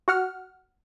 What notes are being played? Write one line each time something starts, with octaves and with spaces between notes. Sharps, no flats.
F#4 F#5 F6